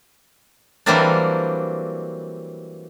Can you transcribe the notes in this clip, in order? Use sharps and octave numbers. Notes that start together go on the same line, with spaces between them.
E3 F#3 G3 A#3 C4 D4